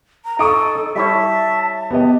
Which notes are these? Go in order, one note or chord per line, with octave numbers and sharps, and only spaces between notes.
A#5
D#4 A4 C#6 D#6 D7
G3 E4 C#5 E5 A5
B3 G4 D#5